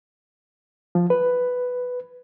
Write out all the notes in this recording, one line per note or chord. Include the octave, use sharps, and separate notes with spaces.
F3
B4